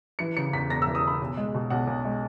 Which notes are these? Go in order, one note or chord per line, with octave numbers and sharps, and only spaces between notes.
E3 C#7
C#3 C#7
E2 B6
E1 A#6
E3 E6
D#6
C#3 B5
B1
G#3
B2
B1 F#5
B1
G#3